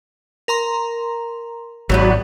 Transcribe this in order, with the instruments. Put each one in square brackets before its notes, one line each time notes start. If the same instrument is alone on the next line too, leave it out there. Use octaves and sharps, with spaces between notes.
[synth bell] A#4 A#5 C6
[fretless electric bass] G#1 [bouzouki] E3 G3 B3 [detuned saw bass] F#3